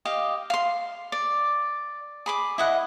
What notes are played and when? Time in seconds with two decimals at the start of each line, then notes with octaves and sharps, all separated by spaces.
0.05 G4 D#5 F5
0.50 F5 C6
1.12 D5
2.26 G#4 B5 D6
2.58 E4 D#5 F#5